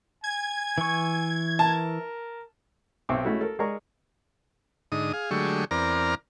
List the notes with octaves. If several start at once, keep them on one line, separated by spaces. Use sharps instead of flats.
G#5 G#6
E3 C#6
A#4 A5
B1 C4 E5 C#6 D6
G#3 A3 C#4 E4 F#4 A4
A4 A#4
G#3 G#4 A#4 D5 A#5 C#6
G#2 D3 D#4 D#6
G#4 F5
D3 F#3 G#3 A3 G4 C#6
E2 C4 A#4 D5 A#5 F6